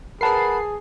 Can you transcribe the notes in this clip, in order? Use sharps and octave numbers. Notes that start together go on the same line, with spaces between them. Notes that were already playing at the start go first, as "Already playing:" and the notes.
G#4 A#4 B4 F#5 A5 B5 C7